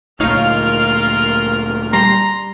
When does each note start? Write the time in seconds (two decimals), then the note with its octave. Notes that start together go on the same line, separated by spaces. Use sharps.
0.20 D2 A#2 D#4 F4 A#4 C#5 F5
1.93 G3 A#5 C6